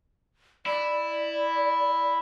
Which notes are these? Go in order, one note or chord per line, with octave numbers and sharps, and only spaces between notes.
E4 D5